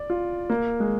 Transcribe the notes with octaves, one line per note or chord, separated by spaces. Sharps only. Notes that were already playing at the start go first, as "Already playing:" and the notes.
Already playing: D5
F4
A#3
G#3